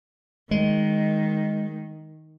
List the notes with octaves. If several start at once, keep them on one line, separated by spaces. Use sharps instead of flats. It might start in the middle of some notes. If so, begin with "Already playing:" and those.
D#3 G#3